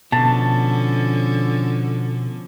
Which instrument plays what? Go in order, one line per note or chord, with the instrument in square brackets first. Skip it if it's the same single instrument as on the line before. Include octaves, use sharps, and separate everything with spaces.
[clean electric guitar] B2 [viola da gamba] D3 F3 C#4 [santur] A5